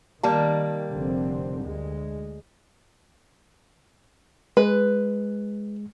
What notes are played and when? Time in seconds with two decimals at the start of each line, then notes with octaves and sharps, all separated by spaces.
0.23 D#3 G3 A#3 A5
0.93 F1 D3 C4
1.63 D2 G#3
4.57 G#3 B4